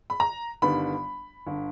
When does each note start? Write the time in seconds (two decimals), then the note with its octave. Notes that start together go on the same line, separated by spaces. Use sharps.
0.10 B5
0.20 A#5
0.62 G1 G2 D#3 G3 B3 B5
1.47 G1 D3